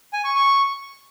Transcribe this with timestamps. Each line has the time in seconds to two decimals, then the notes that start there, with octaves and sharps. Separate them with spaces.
0.13 G#5
0.24 C#6
0.36 C#6